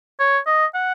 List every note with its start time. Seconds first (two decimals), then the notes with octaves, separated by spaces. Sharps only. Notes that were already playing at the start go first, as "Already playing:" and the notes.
0.20 C#5
0.47 D#5
0.74 F#5